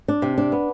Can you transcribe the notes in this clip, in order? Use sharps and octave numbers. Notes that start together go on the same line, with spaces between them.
D4
C3
D4
B3